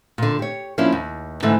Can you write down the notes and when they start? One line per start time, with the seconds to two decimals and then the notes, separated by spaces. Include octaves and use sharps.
0.18 A#2 D3
0.39 G4 C#5
0.78 F3 A#3 C#4 D4 E4
0.92 D#2
1.42 G#2 D3 E3 A3